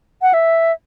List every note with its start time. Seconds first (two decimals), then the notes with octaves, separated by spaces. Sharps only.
0.22 F#5
0.33 E5